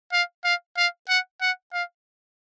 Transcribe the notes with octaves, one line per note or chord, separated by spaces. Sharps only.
F5
F5
F5
F#5
F#5
F5